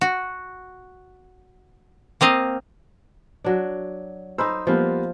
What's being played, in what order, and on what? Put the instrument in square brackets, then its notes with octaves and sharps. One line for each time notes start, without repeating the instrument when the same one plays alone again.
[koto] F#4
A#3 C4 D#5 F5
[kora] F#3 D4
[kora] D#4 C5 [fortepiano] B5 E6
[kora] F3 [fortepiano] G3 A#3 B3